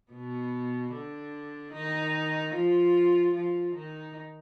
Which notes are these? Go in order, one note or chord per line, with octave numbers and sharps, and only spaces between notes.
B2 B3
D3 D4
D#3 D#4
F3 F4
F3 F4
D#3 D#4